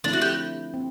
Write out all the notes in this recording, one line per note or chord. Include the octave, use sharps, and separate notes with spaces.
D3 F3 A3 C4 D4 E4
F#4
G4
C4